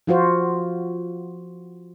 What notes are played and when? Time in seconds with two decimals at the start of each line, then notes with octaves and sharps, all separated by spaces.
0.07 F3 F4 F#4 C5